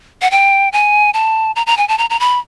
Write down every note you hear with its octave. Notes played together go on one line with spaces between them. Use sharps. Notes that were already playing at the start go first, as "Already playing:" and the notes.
F#5
G5
G#5
A5
A#5
A#5
G#5
A5
A#5
A#5
B5